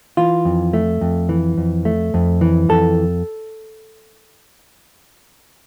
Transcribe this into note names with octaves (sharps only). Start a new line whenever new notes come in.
E3 F4
F2
A3
F2
E3
F2
A3
F2
E3
F2 A4